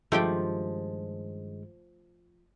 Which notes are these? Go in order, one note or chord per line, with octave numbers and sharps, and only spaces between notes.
G2 D#3 F3 G#3 A3 G4 G5